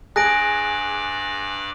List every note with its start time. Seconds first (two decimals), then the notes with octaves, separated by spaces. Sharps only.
0.16 G2 G#4 D5 A5 D6 F#6 A#6 D7